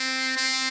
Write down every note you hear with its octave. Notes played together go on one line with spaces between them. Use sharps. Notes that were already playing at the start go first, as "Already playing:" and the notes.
Already playing: C4
C4